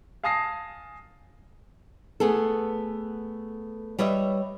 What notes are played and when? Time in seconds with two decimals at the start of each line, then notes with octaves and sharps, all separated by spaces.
0.24 F5 G#5 A5 D#6 A#6 C7
2.20 A3 B3 G#4 A4
3.98 G3 B4 C#5 D#5 E5